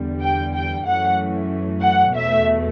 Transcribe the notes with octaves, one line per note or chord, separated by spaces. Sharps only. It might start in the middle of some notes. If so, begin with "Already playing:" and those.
Already playing: E2 D3 G3
G5
G5
F#2 E3 A3 C#4 F#5
F#5
E2 B2 A3 E5